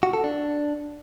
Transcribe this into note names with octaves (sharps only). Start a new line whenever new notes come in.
F#4
A4
D4